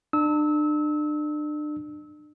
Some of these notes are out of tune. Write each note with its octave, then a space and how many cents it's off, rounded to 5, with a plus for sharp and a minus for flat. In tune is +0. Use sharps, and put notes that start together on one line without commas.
D4 +35 E6 -30